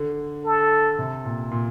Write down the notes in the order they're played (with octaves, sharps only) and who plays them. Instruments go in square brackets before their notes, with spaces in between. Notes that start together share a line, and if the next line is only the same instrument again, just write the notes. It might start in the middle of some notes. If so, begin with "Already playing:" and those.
Already playing: [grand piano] D3
[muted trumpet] A4
[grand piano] C3
A#2
A#2